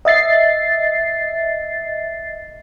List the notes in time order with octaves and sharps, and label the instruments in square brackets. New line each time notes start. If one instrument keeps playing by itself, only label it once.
[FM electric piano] D#5 E5 A6 C7